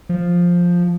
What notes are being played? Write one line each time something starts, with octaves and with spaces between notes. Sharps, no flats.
F3